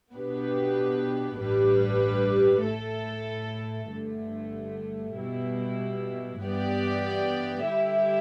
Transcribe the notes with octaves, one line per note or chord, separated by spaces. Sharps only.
B2 B3 D4 G4 B4
A1 G2 G3 D4 B4
A2 A3 E4 A4
G1 G2 D3 A3
B2 G3 E4
G2 E3 B3 G4 D5
D3 G3 E4 G4 E5